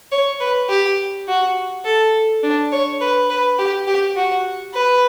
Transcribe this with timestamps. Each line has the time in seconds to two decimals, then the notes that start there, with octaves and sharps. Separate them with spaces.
0.12 C#5
0.40 B4
0.70 G4
1.27 F#4
1.85 A4
2.43 D4
2.72 C#5
3.01 B4
3.30 B4
3.59 G4
3.87 G4
4.16 F#4
4.74 B4